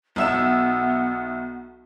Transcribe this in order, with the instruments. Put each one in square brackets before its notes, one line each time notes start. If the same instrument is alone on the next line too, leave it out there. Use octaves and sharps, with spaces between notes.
[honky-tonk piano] B1 E5 E7 [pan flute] B3